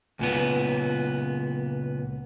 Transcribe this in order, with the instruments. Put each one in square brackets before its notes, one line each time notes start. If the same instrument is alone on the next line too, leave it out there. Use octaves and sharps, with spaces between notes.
[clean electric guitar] C#2 A#2 B3